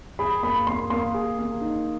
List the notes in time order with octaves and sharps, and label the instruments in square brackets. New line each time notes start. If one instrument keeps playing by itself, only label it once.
[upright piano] G#4 [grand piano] B5
[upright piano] A#3 [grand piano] B5
[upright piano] A#3 [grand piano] C6
[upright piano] A#3 [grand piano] C6
[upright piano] G#4
A#3
D#4